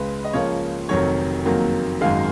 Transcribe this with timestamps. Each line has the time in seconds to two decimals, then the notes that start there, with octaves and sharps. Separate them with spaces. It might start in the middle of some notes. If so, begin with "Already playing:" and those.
Already playing: C#2 C#3 G#3 B4
0.25 D#5
0.33 C#2 C#3 F3 A#3 C#5
0.89 F1 F2 D#3 F#3 C#5
1.45 F#1 F2 D#3 F#3 A#3
2.01 G#1 F#2 D#3 G#3 F5